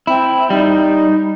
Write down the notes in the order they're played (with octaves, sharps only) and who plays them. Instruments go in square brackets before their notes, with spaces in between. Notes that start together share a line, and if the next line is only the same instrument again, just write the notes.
[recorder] C4 [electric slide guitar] E4
[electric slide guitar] G3 [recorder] D#4